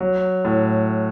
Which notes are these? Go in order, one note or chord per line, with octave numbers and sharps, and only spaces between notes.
F#3
A2